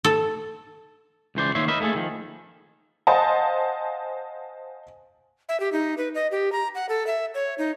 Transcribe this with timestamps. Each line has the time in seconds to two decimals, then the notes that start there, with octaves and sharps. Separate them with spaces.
0.04 A4
1.35 C#2 E3 C5 D5
1.55 D#3 A#3 C#5 E5 C6
1.68 A#4 B4 D#5 E5
1.80 A3 A#3 G#4 A4
1.95 D#3 F3
3.07 C5 D#5 F5 F#5 G#5 A5
5.49 E5
5.60 G4
5.72 D#4
5.98 B4
6.15 D#5
6.31 G4
6.52 A#5
6.75 F#5
6.89 A4
7.07 E5
7.35 C#5
7.58 D#4